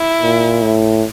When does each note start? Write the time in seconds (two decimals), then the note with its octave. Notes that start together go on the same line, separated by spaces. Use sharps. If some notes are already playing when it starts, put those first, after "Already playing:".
Already playing: E4
0.22 A#2
0.62 A2